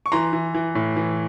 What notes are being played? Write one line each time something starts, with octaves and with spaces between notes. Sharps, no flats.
C#6
E3 A#5 C6
E3
E3
A2
E3